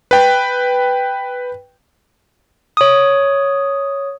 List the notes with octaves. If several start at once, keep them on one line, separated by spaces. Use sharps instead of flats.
B4 G5
C#5 D#6